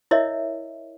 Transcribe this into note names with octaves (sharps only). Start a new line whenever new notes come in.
E4 A#4 C#5 D#5 E5